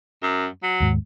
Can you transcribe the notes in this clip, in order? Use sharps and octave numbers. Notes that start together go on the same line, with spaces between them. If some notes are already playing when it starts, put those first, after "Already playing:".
F#2
F#3
D#2 G#2